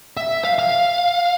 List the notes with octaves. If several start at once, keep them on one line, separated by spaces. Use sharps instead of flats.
E5
F5
F5